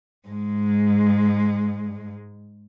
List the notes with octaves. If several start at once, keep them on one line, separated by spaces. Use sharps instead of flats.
G#2 G#3